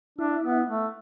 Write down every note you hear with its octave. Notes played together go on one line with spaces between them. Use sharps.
D4 E4
B3
A3